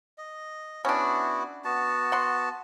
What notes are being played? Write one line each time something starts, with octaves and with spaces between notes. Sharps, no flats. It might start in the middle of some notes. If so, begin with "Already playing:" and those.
D#5
B3 C#4 D4 E4 F#4
B3 F#4 A5
F#5 C6